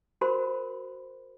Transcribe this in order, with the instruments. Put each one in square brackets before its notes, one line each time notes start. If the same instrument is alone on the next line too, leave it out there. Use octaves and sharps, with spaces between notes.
[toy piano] F#4 A#4 C5 B5 C6